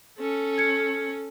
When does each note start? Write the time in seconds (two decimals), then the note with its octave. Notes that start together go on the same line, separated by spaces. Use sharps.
0.19 C#4 A4
0.58 G#6 C#7